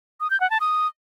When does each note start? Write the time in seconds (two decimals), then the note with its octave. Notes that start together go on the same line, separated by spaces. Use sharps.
0.20 D#6
0.30 G6
0.40 F#5
0.50 A5
0.60 D#6